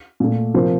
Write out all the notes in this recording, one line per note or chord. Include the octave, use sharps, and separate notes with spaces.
A#2 A3
C3 F3 A#3 C5